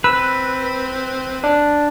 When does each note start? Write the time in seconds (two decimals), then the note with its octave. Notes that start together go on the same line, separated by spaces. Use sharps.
0.04 C4 B4 E6
1.44 D4